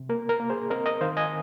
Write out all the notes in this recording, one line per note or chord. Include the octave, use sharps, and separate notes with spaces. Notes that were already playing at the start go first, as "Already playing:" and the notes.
Already playing: C3
A#3 A#4
A#4
A#3
G#4 C5
C4 A#4 D#5
A#4 D#5
D#3 C5 F5
D#5 G#5